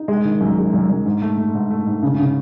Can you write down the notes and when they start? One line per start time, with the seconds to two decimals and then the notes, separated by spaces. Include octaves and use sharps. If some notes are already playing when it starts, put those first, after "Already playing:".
Already playing: D#4
0.08 G#3
0.25 D#3
0.41 F#2
0.58 G#3
0.73 F#2
0.90 F#2
1.06 G#2
1.22 A3
1.37 A3
1.54 G#2
1.70 A3
1.87 G#2
2.02 C#3
2.18 C#3